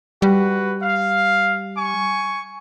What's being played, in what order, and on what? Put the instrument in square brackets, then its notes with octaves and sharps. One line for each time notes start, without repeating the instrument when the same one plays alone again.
[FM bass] G3 [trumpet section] F#4 B4
[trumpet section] F5
G#5 C#6